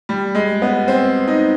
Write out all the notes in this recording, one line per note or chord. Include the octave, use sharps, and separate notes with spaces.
G3
G#3
B3
C4
D#4